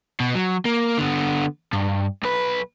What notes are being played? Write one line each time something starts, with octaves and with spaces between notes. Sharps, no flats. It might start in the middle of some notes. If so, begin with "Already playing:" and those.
B2
F#3
A#3
D3 B3
G2
B1 B4